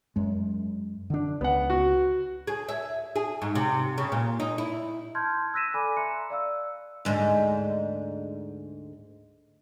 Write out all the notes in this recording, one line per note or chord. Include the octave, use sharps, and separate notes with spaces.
F#2 G#3
D3 D4
C#2 B3 F#5
F#4
G#4
E5
G#4
G#2
C3
C#3
A#2
D#4
E4
A5 C6 F6 G6 G#6
E6 F#6 A#6 B6 D#7 E7
A4 D5 G#5 B5 D6
E5 A#5 C6 F#6 C#7
D5 F5 E6
D2 G#2